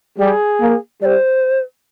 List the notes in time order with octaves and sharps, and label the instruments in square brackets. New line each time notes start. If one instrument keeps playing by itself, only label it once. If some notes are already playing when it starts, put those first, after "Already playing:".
[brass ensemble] G3 [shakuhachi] G#4
[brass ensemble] A#3
[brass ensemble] G3 [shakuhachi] D5
[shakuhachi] C5